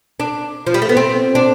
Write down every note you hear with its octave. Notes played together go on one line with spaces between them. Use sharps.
D4
F3
G3
A3
B3
C4
D4